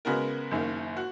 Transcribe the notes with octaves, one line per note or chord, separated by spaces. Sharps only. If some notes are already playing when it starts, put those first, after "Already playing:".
C#3 G#3 B3 F#4 A#4
F#1 F#2 D#3 A#3
F#4